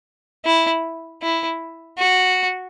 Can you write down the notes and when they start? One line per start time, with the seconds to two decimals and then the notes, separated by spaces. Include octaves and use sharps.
0.45 E4
1.22 E4
1.99 F#4